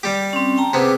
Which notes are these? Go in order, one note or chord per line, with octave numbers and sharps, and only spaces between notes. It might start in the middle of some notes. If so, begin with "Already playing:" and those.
G3 G4
C4 C#4
G5 A5 A#5
C3 B3 G#4 D6